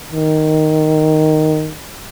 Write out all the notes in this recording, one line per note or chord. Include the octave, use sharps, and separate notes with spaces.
D#3